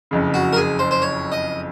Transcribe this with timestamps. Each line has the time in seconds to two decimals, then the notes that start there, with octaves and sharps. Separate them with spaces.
0.11 F#1 F2 C#3
0.34 F#4
0.53 A#4
0.56 G#4
0.79 C5
0.91 C5
1.02 C#5
1.32 D#5